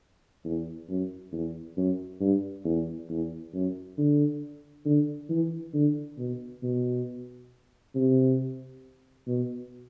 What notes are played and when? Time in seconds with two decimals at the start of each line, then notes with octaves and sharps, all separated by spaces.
0.45 E2
0.89 F#2
1.33 E2
1.77 F#2
2.21 G2
2.65 E2
3.10 E2
3.54 F#2
3.98 D3
4.86 D3
5.30 E3
5.74 D3
6.18 B2
6.63 B2
7.95 C3
9.27 B2